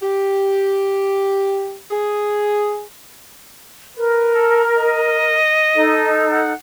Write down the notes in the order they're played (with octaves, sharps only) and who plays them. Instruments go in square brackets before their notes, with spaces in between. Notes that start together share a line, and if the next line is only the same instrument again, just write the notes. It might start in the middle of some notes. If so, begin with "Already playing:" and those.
[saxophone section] G4
G#4
[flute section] A#4 [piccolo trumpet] B4
[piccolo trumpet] A4
D#5
[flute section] D#4 A4
[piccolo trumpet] F#5